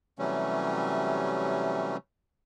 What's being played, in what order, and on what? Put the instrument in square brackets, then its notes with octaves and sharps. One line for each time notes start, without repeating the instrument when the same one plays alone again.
[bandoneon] C3 E3 F#3 G3 A3 C#4